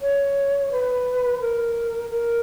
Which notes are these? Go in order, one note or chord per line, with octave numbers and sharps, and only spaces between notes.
C#5
B4
A#4
A#4